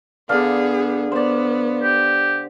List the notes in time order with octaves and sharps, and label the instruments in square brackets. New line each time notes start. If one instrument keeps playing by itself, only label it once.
[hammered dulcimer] D3 D4 F5 [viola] B3 G#4
[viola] B3 [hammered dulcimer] C5 D5
[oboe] G4